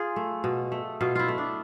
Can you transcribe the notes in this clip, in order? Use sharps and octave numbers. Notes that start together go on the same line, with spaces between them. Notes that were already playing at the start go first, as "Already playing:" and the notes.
Already playing: F4 G#4
A3
B2
A3
B2 F4
E4 F4
A3
D4